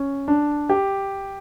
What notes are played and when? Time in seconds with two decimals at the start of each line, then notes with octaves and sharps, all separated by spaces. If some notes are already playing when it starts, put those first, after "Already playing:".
Already playing: C#4
0.28 D4
0.69 G4